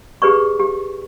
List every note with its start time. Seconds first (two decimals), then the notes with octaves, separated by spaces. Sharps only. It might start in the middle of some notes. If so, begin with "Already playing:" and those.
0.22 G4 G#4 B4 D5 C#6
0.60 G4